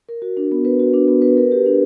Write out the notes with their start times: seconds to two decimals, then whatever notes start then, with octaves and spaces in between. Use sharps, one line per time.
0.09 A#4
0.22 F#4
0.37 D4
0.52 B3
0.65 B4
0.79 F#4
0.93 D4
1.08 B3
1.22 B4
1.37 A#4
1.52 G4
1.66 D4